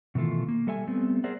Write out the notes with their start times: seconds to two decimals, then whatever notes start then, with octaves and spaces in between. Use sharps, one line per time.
0.15 B2 D#3 E3 A3 F4
0.48 A#3
0.67 G3 A4 E5 G#5
0.87 G3 A3 B3 C4
1.24 G#4 A#4 C5 D5 E5 F#5